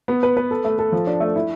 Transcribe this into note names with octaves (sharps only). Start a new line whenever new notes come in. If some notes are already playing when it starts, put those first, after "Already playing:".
B3
B4
B4
A4
A3
A4
F3
D4
A3
E4